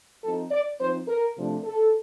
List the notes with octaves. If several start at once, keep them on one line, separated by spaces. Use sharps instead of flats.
F3 C4 D#4 A4
D5
F3 C4 D#4 C5
A#4
C3 F3 A3 D4
A4